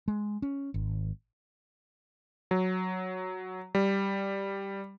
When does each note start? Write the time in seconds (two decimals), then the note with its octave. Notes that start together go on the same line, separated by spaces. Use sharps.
0.08 G#3
0.42 C#4
0.74 G#1
2.51 F#3
3.75 G3